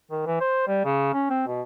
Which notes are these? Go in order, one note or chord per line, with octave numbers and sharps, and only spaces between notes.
D#3
E3
C5
G3
C#3
C#4
C4
B2